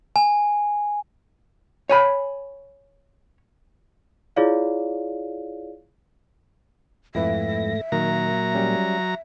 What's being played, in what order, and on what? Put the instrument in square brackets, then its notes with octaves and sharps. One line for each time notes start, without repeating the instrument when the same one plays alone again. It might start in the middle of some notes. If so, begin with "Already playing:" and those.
[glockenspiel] G#5
[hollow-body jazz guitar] C#5 G#5 B5
[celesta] E4 F4 G#4 C#5 D5 F5
[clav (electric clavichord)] F2 E4 B4 [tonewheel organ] G#2 A3 A#6 [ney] E5
[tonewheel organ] A#2 A#3 [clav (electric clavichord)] D#3 [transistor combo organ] F#3 A#5
[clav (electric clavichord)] G3 C#4